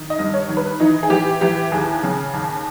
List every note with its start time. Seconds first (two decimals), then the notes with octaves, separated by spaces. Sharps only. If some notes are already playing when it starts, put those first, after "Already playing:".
Already playing: D#3
0.10 D#5
0.19 G2
0.34 C#5
0.49 D#3
0.57 B4
0.80 E3 D#4
1.03 G#4
1.10 E3 G4
1.41 E3 G4
1.72 D#2 G#4
2.03 C#3
2.33 D#2